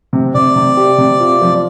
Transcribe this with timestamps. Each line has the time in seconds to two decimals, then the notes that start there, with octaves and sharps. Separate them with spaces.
0.13 C3
0.34 C3 D5
0.56 C3
0.77 G4
0.98 C3
1.20 F4
1.41 F3